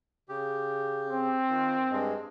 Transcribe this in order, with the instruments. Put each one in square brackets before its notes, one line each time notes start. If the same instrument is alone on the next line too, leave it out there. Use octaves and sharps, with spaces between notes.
[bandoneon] C#3 G4
[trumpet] C4
[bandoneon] D#3 F4
G2 G#3